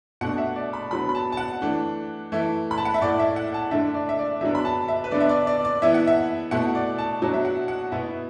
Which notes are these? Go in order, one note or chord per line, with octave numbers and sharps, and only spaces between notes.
B2 A3 D4 F#5
E5
D5
B5
D3 F#3 B3 B5
B5
A5
A5
F#5
E3 A3 D4
E3 A3 E4
B5
A5
F#5
E5
A2 A3 E4 D5
E5
F#5
A5
D3 A3 D4 E5
D5
E5
D5
D3 F#3 B3 D4 E5
B5
A5
E5
B4
D3 B3 D4 D5
E5
D5
D5
D5
E3 B3 E4 E5
F#5
E5
B2 A3 E4 F#5
D5
A5
B2 F#3 D4
E5
F#5
F#5
B2 B3 E4 E5